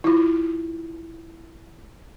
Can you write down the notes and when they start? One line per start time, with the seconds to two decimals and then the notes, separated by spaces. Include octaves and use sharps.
0.04 E4 F4